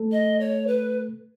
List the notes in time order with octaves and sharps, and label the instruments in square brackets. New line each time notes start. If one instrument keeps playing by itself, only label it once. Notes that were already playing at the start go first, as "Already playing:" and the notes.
Already playing: [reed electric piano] A3 A4
[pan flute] D#5
C#5
B4